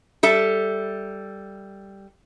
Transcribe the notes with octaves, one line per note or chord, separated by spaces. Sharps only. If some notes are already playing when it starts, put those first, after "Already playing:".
G3 A4 E5